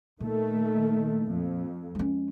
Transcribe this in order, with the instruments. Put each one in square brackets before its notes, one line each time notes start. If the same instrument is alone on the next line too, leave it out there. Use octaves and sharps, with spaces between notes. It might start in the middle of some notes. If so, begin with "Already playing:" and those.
[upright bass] A#2 [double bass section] D#3 A3
[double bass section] F2
[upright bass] G#3 C#4